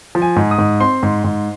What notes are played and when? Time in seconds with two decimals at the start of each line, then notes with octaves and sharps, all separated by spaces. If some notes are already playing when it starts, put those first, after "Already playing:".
0.15 F3
0.22 G#5
0.36 G#2
0.51 D#6
0.58 G#2
0.80 C4 C6
1.03 G#2
1.24 G#2